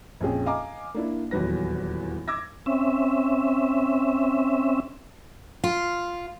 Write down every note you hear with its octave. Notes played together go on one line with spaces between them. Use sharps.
A#1 F2 C#4 G#4 G5
D#5 F5 G#5 A#5 D6
A#3 D4 E4
D#1 E2 F#3 B4 A#6
D6 E6 G#6 A#6
C4 C#4 E5
F4